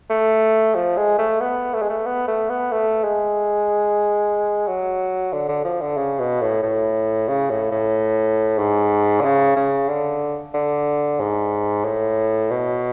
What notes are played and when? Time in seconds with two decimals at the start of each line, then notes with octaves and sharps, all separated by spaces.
0.10 A3
0.75 F3
0.97 G#3
1.19 A3
1.41 B3
1.74 A3
1.82 G#3
1.90 A3
2.06 B3
2.28 A3
2.50 B3
2.72 A3
3.04 G#3
4.68 F#3
5.33 D3
5.49 D3
5.65 F3
5.82 D3
5.97 C#3
6.20 B2
6.42 A2
6.63 A2
7.28 C#3
7.50 A2
7.72 A2
8.59 G#2
9.21 D3
9.25 C#3
9.56 C#3
9.89 D3
10.54 D3
11.20 G#2
11.85 A2
12.51 B2